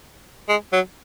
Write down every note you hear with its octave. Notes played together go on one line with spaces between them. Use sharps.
G#3
F#3